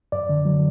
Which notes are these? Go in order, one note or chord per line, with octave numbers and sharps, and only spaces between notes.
F#2 D5
D3
F#3